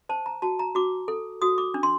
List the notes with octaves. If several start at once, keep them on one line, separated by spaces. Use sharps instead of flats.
C5 A5
A#5
F#4 A5
A#5
F#4 D6
A4
F#4 D#6
D6
D4
C6